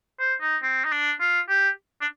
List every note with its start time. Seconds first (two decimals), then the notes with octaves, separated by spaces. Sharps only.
0.19 C5
0.41 D#4
0.62 C4
0.84 D#4
0.91 D4
1.20 F4
1.49 G4
2.01 D4